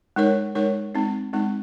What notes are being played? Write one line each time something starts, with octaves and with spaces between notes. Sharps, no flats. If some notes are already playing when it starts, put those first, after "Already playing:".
G#3 D#4 A#4 C#5
G#3 D#4 A#4 C#5
G#3 C4 D#4
G#3 C4 D#4